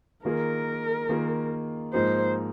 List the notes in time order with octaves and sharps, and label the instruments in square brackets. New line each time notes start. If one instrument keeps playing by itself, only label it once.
[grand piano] D#3 A#3 F4 G#4 [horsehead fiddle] A#4
[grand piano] D#3 A#3 F4 G#4
[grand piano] G#2 F3 A#3 D#4 [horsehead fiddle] C5